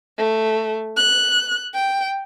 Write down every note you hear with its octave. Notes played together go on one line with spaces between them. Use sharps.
A3
F#6
G5